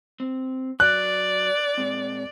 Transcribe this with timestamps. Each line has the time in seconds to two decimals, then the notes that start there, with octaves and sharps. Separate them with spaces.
0.20 C4
0.80 F#3 D5 F#6
1.78 A#2 G#3 C4